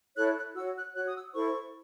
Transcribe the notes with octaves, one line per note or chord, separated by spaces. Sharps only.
E4 A4 C#5 F#6
F#6
F#4 C#5 E6
F#6
F#4 C#5 F#6
D#6
E6
E4 A4 C5 C#6